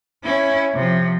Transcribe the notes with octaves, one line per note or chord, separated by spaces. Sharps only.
C#4 E4
C3 F3